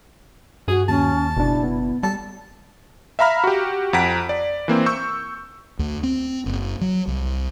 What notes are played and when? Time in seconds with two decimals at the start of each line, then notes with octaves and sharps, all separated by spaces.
0.68 G2 F#4 G#4
0.88 D#2 C#4 A5
1.37 F#1 B2 D4 E4
1.63 B3
2.03 G3 A5
3.19 E5 F5 A#5 B5 F6
3.44 F#4 G4
3.93 F2 F#5 A#5 B6 D7
4.29 D5
4.68 E3 A#3 C4
4.86 C#6 E6 G6
5.79 D2
6.03 C4
6.46 F#1
6.81 F#3
7.07 C2